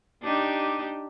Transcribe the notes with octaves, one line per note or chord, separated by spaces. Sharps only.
D4 D#4 G4